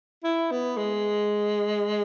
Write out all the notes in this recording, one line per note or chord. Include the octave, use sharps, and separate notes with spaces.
E4
B3
G#3